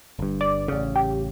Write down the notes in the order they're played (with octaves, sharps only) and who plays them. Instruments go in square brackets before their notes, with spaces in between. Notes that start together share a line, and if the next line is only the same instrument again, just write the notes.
[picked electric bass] G1 G2
[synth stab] D5
[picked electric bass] A1 C#3
[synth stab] G4